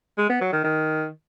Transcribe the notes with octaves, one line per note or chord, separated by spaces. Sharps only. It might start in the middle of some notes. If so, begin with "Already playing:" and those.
G#3
B3
F#3
D#3
D#3